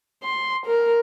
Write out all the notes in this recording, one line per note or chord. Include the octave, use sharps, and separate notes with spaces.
C6
A#4